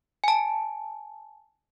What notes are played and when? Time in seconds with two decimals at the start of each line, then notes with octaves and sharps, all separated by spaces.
0.24 G#5 A5